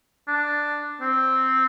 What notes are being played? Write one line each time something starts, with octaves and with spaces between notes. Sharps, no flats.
D4
C4